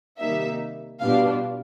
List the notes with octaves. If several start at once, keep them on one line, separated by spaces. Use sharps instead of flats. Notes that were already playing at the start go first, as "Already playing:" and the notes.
C3 D#3 G3 A#3 D#4 E5
B2 G3 B3 D4 F4 F5